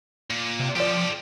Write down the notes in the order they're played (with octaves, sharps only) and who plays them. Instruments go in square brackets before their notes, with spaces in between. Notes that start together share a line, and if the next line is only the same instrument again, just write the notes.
[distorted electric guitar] A#2
[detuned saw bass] C3
[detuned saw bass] F3 [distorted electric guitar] G4 A4 [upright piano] D5 D7